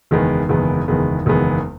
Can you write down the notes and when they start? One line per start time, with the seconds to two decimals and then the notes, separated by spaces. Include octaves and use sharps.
0.11 F#1 E2 D#3 G#3 B3
0.49 F#1 E2 D#3 G#3 B3
0.88 F#1 E2 D#3 G#3 B3
1.26 F#1 E2 D#3 G#3 B3